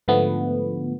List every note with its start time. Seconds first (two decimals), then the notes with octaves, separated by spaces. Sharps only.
0.08 G#2 D3 F3 A3 B3